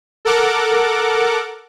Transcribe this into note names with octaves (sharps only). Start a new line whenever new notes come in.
A4 A#4 F#5 D6